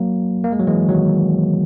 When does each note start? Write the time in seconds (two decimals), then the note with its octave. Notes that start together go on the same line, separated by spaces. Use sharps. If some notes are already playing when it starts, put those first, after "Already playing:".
Already playing: F#3 A#3
0.44 A#3
0.52 G#3
0.59 F#3
0.67 E3 G#3
0.89 D#3 F#3